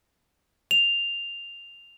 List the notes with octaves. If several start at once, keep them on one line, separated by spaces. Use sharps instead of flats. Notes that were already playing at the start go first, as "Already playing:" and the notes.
F7